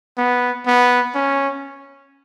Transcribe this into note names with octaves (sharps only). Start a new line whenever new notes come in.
B3
B3
C#4